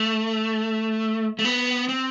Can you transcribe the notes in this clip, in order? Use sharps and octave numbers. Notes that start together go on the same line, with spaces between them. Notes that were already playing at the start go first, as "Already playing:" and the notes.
Already playing: A3
A3
B3
C4